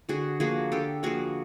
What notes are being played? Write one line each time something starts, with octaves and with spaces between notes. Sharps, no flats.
D3 F#4 G#4
F3 A#3 F#4 G#4
D3 G4 A4
F3 A#3 F#4 G#4